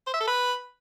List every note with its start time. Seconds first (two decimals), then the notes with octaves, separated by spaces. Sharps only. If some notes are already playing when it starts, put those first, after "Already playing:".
0.07 C5
0.14 E5
0.21 A4
0.27 B4